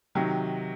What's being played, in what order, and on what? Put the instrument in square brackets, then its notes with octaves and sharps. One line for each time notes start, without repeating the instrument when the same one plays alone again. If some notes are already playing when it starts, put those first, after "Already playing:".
[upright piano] C3 D#3 F#3